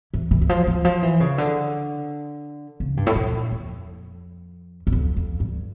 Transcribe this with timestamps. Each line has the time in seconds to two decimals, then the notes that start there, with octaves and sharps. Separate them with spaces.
0.14 E3
0.31 E3
0.41 E3
0.49 F3
0.67 E3
0.85 F3
1.03 E3
1.20 C#3
1.38 D3
2.80 C#3
2.97 G2
3.07 A2
3.16 A#2
3.51 F2
4.87 E2
4.92 F2
5.17 F2
5.40 G2